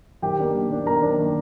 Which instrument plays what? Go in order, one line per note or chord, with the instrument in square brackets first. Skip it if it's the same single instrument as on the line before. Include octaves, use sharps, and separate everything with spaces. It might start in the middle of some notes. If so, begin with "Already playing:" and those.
[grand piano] D#3 G4 G5
A#3 D4
D#3
A#3 D4
D#3 A#4 A#5
A#3 D4
D#3